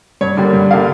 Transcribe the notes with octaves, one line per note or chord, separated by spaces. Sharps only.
G2 C#5
D3 G3 A#3 D5
G2
D3 G3 A#3 F5